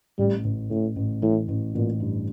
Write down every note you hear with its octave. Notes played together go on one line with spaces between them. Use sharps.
A1 G3
A1
A1 A2
A1
A2 E3
A1
A1 A#2
G2